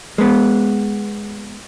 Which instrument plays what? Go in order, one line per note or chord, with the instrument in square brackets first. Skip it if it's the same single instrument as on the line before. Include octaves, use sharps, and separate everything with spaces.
[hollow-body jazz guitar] G#3 B3